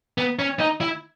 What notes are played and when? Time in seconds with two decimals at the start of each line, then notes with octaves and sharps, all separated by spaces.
0.18 B3
0.39 C#4
0.60 D#4
0.81 E4